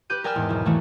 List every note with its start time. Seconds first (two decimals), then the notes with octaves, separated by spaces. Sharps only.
0.10 G4 B4 F#6 G6 D#7
0.24 A#4 D5 G5 G#5 E6 F6
0.35 E2 G#2
0.49 B1 E4
0.65 E3 A3 A#3 E4